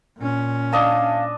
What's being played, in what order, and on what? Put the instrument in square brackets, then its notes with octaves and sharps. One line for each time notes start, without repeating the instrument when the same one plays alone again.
[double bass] A#2 C#4
[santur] D4 D#5 A5 [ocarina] F5